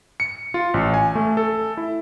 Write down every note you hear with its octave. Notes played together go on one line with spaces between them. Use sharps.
C#7
F4
A1
G#5
A3
A4
E4